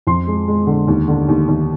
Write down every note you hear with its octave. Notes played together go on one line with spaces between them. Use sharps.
F2 C6
G#3
G#3
D3
D#2
D3
D#2
D#2